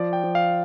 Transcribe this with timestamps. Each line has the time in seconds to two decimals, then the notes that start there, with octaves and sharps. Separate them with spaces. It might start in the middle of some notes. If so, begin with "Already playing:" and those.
Already playing: F3 D5
0.13 G5
0.24 F3
0.35 F5